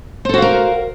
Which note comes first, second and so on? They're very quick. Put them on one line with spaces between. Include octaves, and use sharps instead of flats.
C5 A4 F#4 F5 A#4